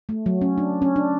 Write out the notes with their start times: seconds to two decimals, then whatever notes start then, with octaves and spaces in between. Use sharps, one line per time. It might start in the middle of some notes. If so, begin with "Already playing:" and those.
0.09 A3
0.26 F#3
0.41 C#4
0.58 D4
0.82 C#4
0.96 D4